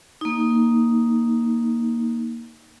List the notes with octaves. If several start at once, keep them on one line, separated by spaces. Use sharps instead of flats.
A#3 D#4